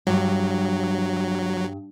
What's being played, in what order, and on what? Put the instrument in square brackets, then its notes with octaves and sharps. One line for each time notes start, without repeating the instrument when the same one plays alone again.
[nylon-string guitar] G2 [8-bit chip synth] F#3